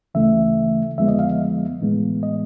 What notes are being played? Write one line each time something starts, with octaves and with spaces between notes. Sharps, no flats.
D2 C#3 E3 A3 E5
F2 D3 F3 G#3 B3 E5
D#5
F5
A2 E3 G#3 B3
D#5